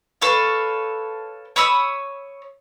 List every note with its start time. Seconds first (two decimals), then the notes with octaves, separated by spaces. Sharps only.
0.22 A4 B4 C#5 F5
1.56 C#5 B5 D#6 E6